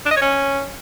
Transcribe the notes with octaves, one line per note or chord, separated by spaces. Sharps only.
D4
D#5
C#5
C#4